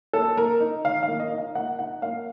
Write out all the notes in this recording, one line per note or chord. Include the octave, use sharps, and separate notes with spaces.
A#3 A4
A#3 A#4
D#4
D#3 F5
F5
A#3
D#5
D#4
F5
A#3 F#5
D#4 F#5
A#3 F5